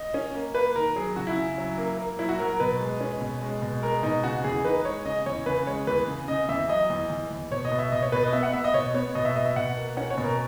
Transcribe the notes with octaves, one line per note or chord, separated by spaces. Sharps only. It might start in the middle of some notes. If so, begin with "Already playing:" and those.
Already playing: D#5
C#4
A#3
A#3 B4
D#3 A#4
F#3 G#4
C#3 F#4
E4
C#3
F#3
A#3
A#3
F#3 E4
F#4
F#3 A#4
A#4
B2 B4
G#3
C#4
B2
G#3
B2
G#3 A#4
B2 D#4
C#3 F#4
E2 G#4
D#4 B4
G#3 C#5
C#3 D#5
E2 C#5
C#3 B4
G#3 C#5
E2 B4
C#3
C#3 D#5
E2 E5
F#3 D#5
E2
E2
E2
B2 C#5
D#5
B2
E5
B2 D#5
C#5
B2 B4
D#5
B3 E5
F#5
B3 E5
D#5
B2 C#5
B3 C#5
B2 D#5
E5
B2 D#5
E5
B2 F#5
A#3
C#4 F#5
C#5
B2
A#4